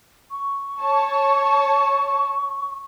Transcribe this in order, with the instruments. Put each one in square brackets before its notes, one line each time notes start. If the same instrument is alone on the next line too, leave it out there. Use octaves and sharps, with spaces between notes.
[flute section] C#6
[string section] C#5 A5